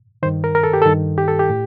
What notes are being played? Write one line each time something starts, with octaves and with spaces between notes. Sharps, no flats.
G2 D#3 C5
A#4
A#4
A4
G4
G2 D#3 A4
G4
A4
G4
A2